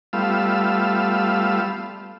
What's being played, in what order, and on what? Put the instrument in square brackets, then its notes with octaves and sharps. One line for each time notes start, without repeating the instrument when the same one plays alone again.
[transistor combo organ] G3 A3 B3 F4 F5 E6